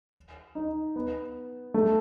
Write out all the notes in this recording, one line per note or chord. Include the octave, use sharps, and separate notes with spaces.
D#4
B3
A3